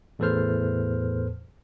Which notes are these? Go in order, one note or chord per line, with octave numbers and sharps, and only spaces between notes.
E2 A2 A4 B4 C5 F6